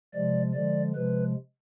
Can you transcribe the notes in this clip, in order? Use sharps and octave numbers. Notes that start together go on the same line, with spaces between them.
C3 F3 G#3 D5
D3 F3 G#3 D5
C3 F3 G#3 B4